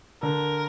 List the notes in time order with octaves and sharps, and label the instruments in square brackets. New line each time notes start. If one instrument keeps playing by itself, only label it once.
[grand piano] D3 [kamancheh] A#4